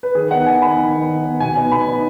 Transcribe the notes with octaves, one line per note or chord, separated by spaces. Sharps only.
B4
D#3 G#4
B3 D#4 F#5
D#3 G#5
B3 D#4 B5
D#3
B3 D#4
D#3
B3 D#4
B2 G#5
B3 D#4
B2 B5
B3 D#4